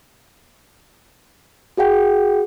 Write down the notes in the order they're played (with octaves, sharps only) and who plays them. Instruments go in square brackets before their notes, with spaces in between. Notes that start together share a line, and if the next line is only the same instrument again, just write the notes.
[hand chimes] F#4 G#4 F#5 G5